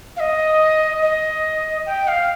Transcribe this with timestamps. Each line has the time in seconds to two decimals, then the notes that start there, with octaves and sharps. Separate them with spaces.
0.16 F5
0.20 D#5
1.02 D#5
1.86 G5
2.08 F5